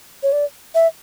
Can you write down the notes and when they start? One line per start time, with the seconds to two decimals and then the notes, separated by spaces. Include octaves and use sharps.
0.23 C#5
0.32 D5
0.75 E5